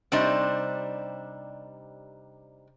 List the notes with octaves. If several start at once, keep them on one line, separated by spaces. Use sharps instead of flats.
C3 G3 D4 D#4 C5